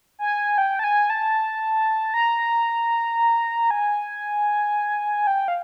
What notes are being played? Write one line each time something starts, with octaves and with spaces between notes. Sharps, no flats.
G#5
G5
A5
G#5
A5
A#5
G#5
G5
F5